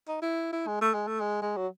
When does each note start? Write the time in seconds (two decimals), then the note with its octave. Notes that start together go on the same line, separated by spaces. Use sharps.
0.08 D#4
0.22 E4
0.53 E4
0.67 G#3
0.81 A3
0.94 G#3
1.08 A3
1.20 G#3
1.42 G#3
1.57 F#3